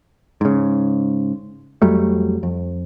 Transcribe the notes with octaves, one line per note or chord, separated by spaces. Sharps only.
G#2 C#3
F2 F#3 G3 A3
F2